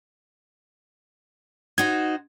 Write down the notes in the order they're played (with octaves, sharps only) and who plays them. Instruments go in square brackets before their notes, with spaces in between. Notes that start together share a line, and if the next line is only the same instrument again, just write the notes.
[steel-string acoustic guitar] D#4 F#4 C5 [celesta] G#6